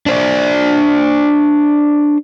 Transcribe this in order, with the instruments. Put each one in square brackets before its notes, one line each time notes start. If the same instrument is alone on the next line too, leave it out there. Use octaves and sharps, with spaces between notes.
[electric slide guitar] D4 C5 D5